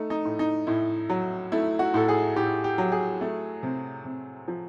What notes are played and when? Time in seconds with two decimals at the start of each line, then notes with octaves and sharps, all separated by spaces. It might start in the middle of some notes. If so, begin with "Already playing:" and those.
Already playing: A3 D#4
0.10 D#4
0.25 A2
0.39 D#4
0.67 A2 E4
1.09 F#3
1.52 A3 E4
1.79 F#4
1.94 A2 A4
2.08 G#4
2.36 A2 G4
2.64 G4
2.78 F#3
2.92 G#4
3.21 A3
3.63 C3
4.05 C3
4.48 F3